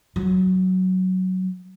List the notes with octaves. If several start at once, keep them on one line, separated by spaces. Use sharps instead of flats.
F#3